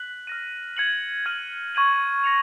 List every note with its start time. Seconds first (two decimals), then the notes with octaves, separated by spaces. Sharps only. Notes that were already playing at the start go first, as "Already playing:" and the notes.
Already playing: F#6 B6 F#7
0.27 F6 A#6 D#7
0.77 G#6 C#7 F#7
1.26 F6 G#6 D#7 F#7
1.75 C#6 G#6 D#7 F#7
2.24 A#6 C#7 F7